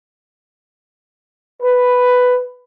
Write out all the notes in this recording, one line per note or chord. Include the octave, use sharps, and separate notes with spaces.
B4